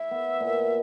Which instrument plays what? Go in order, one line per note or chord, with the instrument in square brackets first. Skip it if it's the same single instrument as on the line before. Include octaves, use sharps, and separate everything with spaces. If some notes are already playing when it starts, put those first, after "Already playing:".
Already playing: [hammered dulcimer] E4 [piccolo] E5
[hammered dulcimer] B3
A#2